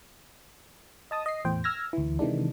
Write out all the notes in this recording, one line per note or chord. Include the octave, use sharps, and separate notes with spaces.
D#5 A5 D#6
D#5 C7
E2 A2 C5 G5
E6 F6 G#6 A#6
D2 E3
C3 D#3 E3 G#3 D4